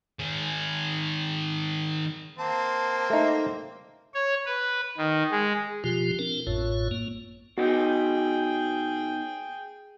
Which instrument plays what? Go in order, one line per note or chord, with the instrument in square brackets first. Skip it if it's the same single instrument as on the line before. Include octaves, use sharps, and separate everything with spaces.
[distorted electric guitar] D#3 G#4
[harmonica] A#3 C4 [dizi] A5
[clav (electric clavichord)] A3 D#4
[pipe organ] C#5
B4
D#3
G#3
[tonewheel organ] B2 F3 F4 G4
C4 D4 A#4
A1 F#2 A2 F4 C#5
A#3
[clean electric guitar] B2 D#4 [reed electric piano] F#4 [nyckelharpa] G#4 G5